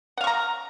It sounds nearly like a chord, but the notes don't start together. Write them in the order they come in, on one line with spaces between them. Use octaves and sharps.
F#5 F5 C#6 A#5